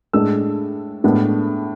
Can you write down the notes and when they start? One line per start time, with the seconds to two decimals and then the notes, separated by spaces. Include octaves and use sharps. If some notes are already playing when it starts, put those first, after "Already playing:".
0.13 A2 G#3 D4 E6
1.04 A2 G#3 B3 D4